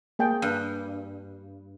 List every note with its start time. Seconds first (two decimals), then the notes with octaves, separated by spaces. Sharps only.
0.19 A#3 G#4 G5
0.42 G2